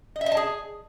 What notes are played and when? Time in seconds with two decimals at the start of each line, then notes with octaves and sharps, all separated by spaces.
0.16 D#5
0.21 E5
0.26 D#5
0.32 A5
0.37 G#4